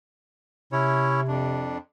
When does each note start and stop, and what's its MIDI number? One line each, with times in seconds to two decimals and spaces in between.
0.72 1.73 48
0.72 1.21 61
0.72 1.21 64
0.72 1.21 73
1.28 1.78 41
1.28 1.78 62